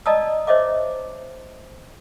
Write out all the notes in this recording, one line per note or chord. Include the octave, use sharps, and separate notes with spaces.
D5 D#5 A5 A#5 D#6 E6
C5 C#5 D#5 E5 D6